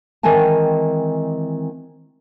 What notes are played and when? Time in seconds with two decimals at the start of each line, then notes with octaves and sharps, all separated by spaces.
0.23 D#3 E3 G#3 C4 G#5 A5